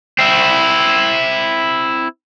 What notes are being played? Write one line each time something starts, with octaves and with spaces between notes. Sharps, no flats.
C4 E4